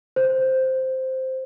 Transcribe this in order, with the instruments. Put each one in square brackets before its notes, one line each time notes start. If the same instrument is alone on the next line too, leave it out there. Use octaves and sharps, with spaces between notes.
[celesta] C5